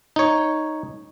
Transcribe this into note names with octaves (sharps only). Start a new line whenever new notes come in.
D#4 C#5